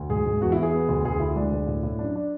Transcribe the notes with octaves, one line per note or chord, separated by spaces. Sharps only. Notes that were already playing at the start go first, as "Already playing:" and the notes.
Already playing: D2
G#2 G#4
G#2
E2 F#4
E4
E2
G#4
B3
D2
D2 G#4
D2 E4
G#3 D4
D2
A2
A2
F#2 D4
D4